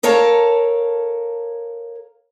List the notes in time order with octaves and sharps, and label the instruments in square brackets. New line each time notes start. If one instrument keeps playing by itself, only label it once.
[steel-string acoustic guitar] A4 A#4 C#5 F5 A5 A#5